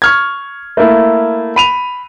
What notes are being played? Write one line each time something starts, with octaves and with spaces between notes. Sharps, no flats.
C#6 F6 G#6
A3 A#3 E4
B5 D#7 F7